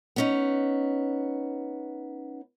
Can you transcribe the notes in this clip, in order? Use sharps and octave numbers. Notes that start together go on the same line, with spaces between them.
B3 C#4 D#4